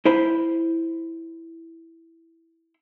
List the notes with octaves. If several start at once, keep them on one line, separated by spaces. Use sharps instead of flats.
E4 C5 B5